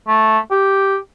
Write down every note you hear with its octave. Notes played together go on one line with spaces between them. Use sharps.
A3
G4